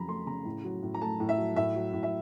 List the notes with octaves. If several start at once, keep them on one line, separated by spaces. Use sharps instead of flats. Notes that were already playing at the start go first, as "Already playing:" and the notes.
Already playing: F2 C#3 F#3 A#5 B5
A3 C6
C#3 A#5
A2
F#3
A2
A#5
A3 A5
A2
E5
F#3
A2 E5
F#3
A2
E5